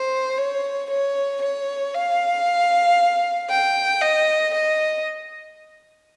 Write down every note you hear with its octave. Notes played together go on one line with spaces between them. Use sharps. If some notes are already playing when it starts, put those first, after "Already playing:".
Already playing: C5
C#5
C#5
C#5
F5
G5
D#5
D#5